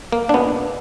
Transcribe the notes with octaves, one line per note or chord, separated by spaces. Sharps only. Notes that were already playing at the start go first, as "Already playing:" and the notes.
A#3
D4
A#2 G#3 B3